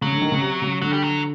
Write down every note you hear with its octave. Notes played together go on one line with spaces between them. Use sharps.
C#3 F#3
D3
D#3
C#3
C3
C#3
D3 F#3
G3
F#3